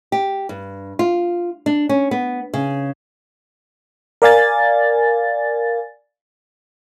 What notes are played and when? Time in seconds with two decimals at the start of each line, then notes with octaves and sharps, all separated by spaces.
0.12 G4
0.49 G2
0.99 F4
1.66 D4
1.89 C#4
2.11 B3
2.54 C#3
4.22 A#4 D5 F5 G#5 A6